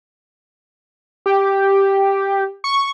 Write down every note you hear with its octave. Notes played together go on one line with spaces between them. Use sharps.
G4
C#6